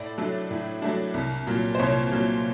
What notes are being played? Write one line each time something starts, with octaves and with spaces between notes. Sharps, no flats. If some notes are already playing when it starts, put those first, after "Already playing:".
Already playing: A2 D5
F#3 A3 D4
A2
F#3 A3 D4
C2
A#2 F#3
C5
C2 C#5
A#2 F#3